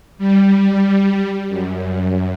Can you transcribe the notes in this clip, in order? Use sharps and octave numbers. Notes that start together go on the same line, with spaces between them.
G3
F#2